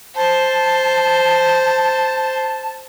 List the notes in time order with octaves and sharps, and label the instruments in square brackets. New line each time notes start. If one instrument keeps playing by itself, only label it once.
[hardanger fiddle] C5 [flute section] A5